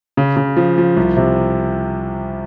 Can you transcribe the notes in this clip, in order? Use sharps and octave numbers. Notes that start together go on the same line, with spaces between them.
C#3
C#3
F3
F3
C2
C3